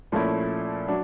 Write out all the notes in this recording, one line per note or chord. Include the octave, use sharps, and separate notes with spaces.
A#2 F3 A3 C#4 E4
F#3 D4